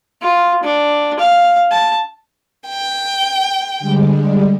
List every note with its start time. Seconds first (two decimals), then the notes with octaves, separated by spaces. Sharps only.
0.21 F4
0.63 D4
1.19 F5
1.71 A5
2.68 G5
3.79 D3 G3 G#3